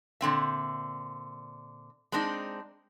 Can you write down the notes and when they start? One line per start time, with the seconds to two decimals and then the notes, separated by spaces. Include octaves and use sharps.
0.21 A#2 D3 C4 E5
2.12 G#3 C4 D4 D#4